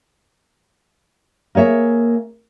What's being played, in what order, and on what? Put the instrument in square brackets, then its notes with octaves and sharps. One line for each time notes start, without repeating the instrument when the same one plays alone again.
[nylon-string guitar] A#3 G#4 C#5 E5